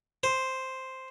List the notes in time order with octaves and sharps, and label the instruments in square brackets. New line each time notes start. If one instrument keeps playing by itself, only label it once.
[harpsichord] C5